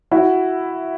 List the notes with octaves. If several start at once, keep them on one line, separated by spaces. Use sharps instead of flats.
E4 F#4